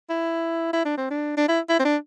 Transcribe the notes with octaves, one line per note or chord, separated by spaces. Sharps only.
E4
E4
D4
C4
D4
D4
E4
E4
C4
D4